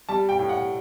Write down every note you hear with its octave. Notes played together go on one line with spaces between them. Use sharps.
G3 A5
G5
A2
F#5